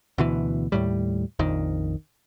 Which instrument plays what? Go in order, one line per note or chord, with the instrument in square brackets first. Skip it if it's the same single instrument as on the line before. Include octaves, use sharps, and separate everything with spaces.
[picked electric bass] D2 B2 E3
D#2 A2 G3
A#1 F2 D#3